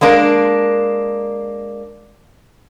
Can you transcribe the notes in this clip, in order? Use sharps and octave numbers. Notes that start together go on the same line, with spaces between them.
G#3 A#3 D4 A#4